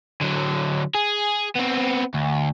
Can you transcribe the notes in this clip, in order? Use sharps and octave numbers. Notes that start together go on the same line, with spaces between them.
D3 F#3
G#4
B3 C4
D2